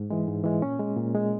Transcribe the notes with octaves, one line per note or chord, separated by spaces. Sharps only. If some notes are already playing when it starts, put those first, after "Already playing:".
Already playing: G#2
E3 G#3
G#2
E3 G#3
A#2 C#4
G#3
A#2
G#3